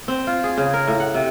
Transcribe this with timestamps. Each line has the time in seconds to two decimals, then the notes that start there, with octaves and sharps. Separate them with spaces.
0.08 C4
0.27 F4
0.44 G#4
0.58 C#3
0.73 A#4
0.87 A2
1.00 F#5
1.14 C3